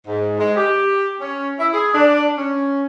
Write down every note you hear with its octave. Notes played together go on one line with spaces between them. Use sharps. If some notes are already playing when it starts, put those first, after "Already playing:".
G#2
G#3
G4
C#4
E4
G#4
D4
C#4